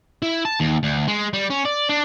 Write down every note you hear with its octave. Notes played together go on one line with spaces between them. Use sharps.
E4
A5
D#2
D2
G#3
G3
C#4
D5
D4